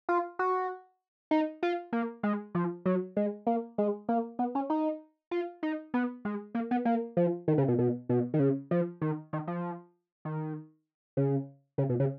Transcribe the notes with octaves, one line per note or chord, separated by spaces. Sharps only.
F4
F#4
D#4
F4
A#3
G#3
F3
F#3
G#3
A#3
G#3
A#3
B3
C#4
D#4
F4
D#4
B3
G#3
A#3
B3
A#3
F3
D#3
C#3
B2
B2
B2
D#3
C#3
F3
D#3
D#3
F3
D#3
C#3
C#3
B2
C#3